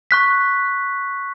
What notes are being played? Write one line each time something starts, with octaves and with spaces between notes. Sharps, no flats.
C#6 F#6 B6